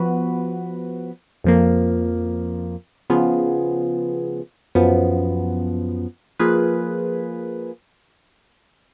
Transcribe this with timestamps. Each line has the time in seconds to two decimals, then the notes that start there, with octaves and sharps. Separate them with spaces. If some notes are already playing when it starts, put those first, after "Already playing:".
Already playing: F3 B3 F#4 B4
1.44 F2 F3 A#3
3.10 C#3 F3 B3 F4 G#4
4.75 F#2 F3 B3
6.39 F3 A#3 F4 G#4 B4